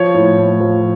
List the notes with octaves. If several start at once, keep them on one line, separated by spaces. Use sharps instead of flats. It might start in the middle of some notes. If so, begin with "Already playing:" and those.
Already playing: F3 C#5
A2
A2
F3